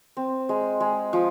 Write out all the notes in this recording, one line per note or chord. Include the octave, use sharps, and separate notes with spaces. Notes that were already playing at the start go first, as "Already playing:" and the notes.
C4
G#3
G#3
F3